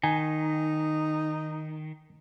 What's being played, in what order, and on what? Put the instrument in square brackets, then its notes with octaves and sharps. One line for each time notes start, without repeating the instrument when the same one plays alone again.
[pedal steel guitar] D#3 [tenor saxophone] D#4 [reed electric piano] G#5